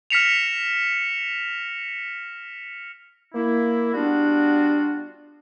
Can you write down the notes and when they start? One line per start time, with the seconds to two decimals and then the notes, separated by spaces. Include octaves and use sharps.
0.10 F6 A#6 B6 C#7 E7 F7
3.34 A#3 E4
3.94 G3 B3 D4 F4 F#4